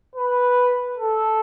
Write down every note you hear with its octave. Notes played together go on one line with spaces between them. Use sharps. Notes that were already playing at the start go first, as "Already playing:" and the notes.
B4
A4